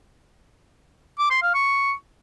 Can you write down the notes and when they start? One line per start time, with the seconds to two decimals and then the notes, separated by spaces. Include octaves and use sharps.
1.19 D6
1.30 C6
1.42 F5
1.54 C#6